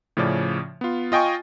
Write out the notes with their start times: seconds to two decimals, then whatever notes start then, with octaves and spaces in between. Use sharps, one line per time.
0.17 A2 C#3 F3 C#4 D5
0.81 B3 F4
1.12 F4 D#5 G5 G#5 C#6